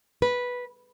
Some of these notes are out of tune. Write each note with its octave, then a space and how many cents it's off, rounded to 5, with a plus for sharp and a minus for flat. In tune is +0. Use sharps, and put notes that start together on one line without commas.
B4 -10